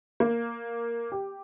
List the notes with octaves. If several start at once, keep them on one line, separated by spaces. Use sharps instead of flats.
A#3
G4